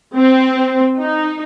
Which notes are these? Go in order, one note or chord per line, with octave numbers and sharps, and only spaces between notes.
C4
D#4